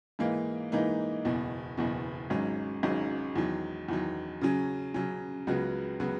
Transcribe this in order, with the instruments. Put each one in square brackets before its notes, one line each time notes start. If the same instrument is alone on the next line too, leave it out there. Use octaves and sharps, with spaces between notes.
[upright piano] G#2 E3 A#3 D#4
G#2 E3 A#3 D#4
F#1 E2 B2
F#1 E2 B2
G#1 G#2 F#3 C#4
G#1 G#2 F#3 C#4
E2 D#3 F#3
E2 D#3 F#3
C#3 F#3 C#4
C#3 F#3 C#4
C#2 C#3 F#3 B3 F#4
C#3 F#3 B3 F#4